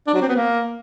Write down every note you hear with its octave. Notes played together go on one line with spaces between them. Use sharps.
D4
F#3
C4
B3
A#3